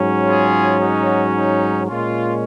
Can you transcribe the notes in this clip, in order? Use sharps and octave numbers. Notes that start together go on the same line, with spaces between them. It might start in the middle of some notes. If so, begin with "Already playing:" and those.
Already playing: G#2 F#3 C#4
F4 G#4
D#4 F#4
D#4
A#2 G#3 C#4 F4